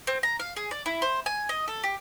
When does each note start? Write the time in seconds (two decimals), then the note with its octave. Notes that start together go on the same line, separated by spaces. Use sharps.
0.07 C4
0.23 A#5
0.39 F5
0.56 G#4
0.71 D5
0.86 E4
1.02 C5
1.26 G#5
1.49 D#5
1.68 A4
1.83 G4